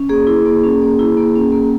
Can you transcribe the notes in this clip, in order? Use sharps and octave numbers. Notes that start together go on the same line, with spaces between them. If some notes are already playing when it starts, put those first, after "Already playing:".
Already playing: C#4
A#3 G#4
E4
A#3
C#4
A#3
E4
A#3
C#4
A#3